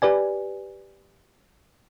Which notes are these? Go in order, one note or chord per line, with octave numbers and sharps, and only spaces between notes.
G4 B4 D5 G#5